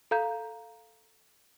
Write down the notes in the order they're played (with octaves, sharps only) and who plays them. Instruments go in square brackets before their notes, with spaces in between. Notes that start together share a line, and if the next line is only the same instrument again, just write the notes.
[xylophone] A4 F5 A#5 G6